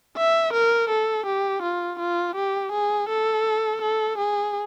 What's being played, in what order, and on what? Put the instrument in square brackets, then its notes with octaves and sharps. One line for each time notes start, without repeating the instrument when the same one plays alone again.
[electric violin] E5
A#4
A4
G4
F4
F4
G4
G#4
A4
A4
G#4